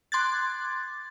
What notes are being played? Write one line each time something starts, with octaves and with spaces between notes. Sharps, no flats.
C6 D6 F#6 G#6 A6